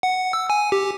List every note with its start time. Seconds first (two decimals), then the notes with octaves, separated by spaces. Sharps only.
0.03 F#5
0.33 E6
0.50 G#5
0.72 G4